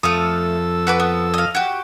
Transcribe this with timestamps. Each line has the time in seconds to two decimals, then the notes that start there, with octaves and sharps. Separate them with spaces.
0.03 F2 A3 A4 F5 D#6 E6
0.87 F#4 B4 D6
1.00 B3
1.34 D#5 F5
1.55 F#4 G4